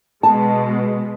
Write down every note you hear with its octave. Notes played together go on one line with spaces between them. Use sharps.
B2 G#3 A5